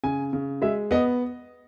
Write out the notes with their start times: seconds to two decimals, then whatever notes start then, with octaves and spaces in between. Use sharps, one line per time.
0.04 C#3 G#5
0.33 C#3
0.62 G#3 E5
0.91 B3 D#5